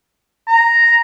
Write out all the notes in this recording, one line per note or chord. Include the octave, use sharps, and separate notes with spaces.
A#5